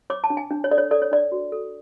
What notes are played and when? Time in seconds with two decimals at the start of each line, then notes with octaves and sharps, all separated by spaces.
0.10 C#5 D6
0.24 A5
0.30 D4
0.37 G#5
0.51 D4
0.64 C#5
0.71 A4 D5
0.78 C#5
0.91 A4 D5
1.02 C#5
1.11 D4 D5
1.32 F#4
1.52 A4